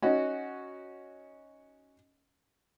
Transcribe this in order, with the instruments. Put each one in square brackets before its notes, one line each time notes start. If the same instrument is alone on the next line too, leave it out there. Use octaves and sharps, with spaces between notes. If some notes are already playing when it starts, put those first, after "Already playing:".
[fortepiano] C#4 D#4 F#4